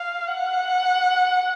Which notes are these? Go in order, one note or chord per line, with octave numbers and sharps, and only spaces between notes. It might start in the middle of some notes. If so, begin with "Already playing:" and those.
Already playing: F5
F#5